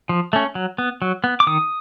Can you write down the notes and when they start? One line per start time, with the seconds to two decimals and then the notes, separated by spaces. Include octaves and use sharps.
0.09 F3
0.33 A3 C#4
0.55 F#3
0.78 B3
1.02 F#3
1.24 B3
1.40 D6
1.47 D#3 D#6